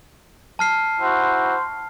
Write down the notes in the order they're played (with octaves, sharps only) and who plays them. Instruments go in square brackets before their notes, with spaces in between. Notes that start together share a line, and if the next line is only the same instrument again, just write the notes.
[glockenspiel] A5 F6 C7
[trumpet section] E4 F#4 C5